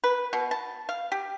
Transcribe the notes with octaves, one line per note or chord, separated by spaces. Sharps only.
B4
B2
A5
F5
G4